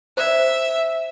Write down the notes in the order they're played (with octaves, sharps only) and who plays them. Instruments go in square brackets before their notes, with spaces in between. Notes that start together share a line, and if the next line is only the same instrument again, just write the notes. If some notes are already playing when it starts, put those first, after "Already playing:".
[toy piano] C5 D5 [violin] E5